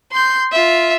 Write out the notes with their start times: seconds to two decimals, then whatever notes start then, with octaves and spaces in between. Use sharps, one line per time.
0.12 C6 G6
0.52 F4 E5